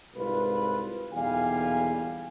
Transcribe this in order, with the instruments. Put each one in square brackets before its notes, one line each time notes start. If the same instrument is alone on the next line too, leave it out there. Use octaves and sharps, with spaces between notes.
[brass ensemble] C2 G#2 F4 B4
B1 E2 A#2 G3 F5 G#5